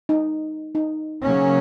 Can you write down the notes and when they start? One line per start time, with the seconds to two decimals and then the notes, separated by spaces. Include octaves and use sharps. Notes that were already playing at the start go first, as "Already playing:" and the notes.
0.09 D#4
0.75 D#4
1.24 C#3 F#3 A#3 C#4